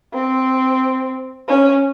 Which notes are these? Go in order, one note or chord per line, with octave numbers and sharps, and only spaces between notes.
C4
C#4